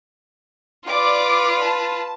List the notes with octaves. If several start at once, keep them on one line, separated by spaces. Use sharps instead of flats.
F4 B4 D5 D6
A5